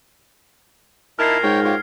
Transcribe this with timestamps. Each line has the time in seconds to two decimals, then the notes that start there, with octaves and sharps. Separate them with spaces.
1.19 A#2 D#4 E4 A#4 A5 F6 G#6 C7
1.43 G#2 C#5 G5
1.65 F4 G4 C#5